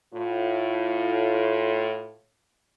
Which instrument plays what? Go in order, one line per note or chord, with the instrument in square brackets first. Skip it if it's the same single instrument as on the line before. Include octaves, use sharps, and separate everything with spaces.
[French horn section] A2 F4